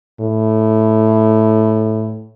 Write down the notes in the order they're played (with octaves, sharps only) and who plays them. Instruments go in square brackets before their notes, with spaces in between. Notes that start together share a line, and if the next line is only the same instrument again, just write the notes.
[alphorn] A2